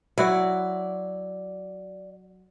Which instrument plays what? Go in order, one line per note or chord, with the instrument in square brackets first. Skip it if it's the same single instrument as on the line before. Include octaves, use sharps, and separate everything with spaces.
[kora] F#3 E4 F#4 [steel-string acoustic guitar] D5